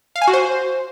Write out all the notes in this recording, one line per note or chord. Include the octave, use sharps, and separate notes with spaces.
F5
G#5
F#4
C5